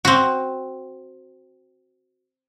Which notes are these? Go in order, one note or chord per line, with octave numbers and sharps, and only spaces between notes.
C4 F#4